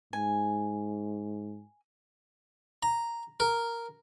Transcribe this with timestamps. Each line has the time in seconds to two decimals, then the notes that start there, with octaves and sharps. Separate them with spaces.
0.13 G#2 G#5
2.83 A#5
3.40 A#4